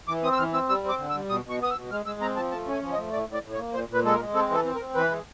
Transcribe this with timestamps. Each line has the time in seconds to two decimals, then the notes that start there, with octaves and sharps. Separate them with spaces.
0.08 E3 D6
0.23 C4 D#6
0.33 E6
0.38 E3 F6
0.53 C4 E6
0.69 G3 E6
0.84 C4 D6
0.99 D3
1.10 E6
1.15 G3
1.30 B2 D#6
1.45 B2 C#6
1.60 B3 D#6
1.71 E6
1.76 B2
1.91 G#3 F6
2.06 G#3 E6
2.21 C4 A#5
2.36 F3 A5
2.52 A3 A5
2.67 C#4 G#5
2.82 F3
2.92 D#5
2.98 A3
3.12 A2 D5
3.28 A2
3.33 D5
3.43 A2
3.53 C#5
3.58 A#3
3.74 A#2 C5
3.89 A#2 B4
4.04 G#3 A4
4.15 A#4
4.19 G#3
4.34 C4 A4
4.50 E3 A4
4.65 C4
4.76 A#4
4.80 C4
4.95 E3 B4
5.11 G#3